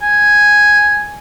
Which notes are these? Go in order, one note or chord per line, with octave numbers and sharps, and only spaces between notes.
G#5